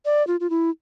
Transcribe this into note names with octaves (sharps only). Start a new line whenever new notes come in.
D5
F4
F4
E4